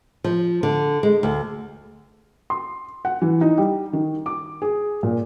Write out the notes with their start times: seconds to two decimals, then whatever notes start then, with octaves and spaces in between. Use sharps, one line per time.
0.24 F3
0.63 D3
1.03 G#3
1.23 D2
2.50 C6
3.05 F#5
3.22 E3
3.41 D#4
3.58 G3
3.93 D#3
4.26 D6
4.62 G#4
5.03 A#2